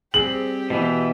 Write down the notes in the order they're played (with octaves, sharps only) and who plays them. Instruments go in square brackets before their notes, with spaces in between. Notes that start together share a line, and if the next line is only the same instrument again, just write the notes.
[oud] G3 C4 G#4 [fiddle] G4 [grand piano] F#7
[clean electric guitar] B2 E3